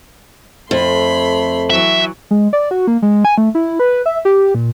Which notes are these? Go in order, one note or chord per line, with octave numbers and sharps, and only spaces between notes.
F2 A3 B5 C6
E3 F#3 E5
G#3
D5
F#4
A#3
G#3
G#5
A3
E4
B4
E5
G4
A#2